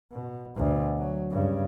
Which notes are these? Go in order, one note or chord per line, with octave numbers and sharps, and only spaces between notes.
B2
D2 B2
F#3
G2 C#3